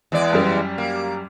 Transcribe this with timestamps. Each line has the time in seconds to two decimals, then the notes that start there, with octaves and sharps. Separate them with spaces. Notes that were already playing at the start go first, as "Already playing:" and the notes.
0.12 E2 G#3 D5
0.33 F#2 G3 G4
0.78 A#3